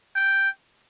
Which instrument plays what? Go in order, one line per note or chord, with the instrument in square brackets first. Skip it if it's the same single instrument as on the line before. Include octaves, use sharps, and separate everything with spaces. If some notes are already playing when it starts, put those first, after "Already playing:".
[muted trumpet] G5